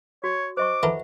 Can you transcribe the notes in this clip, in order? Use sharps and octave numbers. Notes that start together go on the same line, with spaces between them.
F#4 C#5
C5 D#5 C#6 D6
E3 A4 A#4 E5 F#5 B5